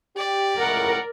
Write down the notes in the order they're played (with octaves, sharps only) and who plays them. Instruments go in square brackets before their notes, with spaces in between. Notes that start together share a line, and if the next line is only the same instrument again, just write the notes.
[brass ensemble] G4 [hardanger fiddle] D5
[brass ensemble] C#2 A2 [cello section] A#4 [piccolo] F#5